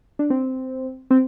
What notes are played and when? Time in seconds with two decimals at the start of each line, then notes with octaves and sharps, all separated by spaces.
0.19 D4
0.30 C4
1.11 C4